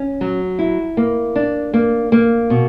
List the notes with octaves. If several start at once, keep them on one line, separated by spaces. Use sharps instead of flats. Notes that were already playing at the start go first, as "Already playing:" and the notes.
Already playing: C#4
F#3
E4
A#3
D4
A#3
A#3
B2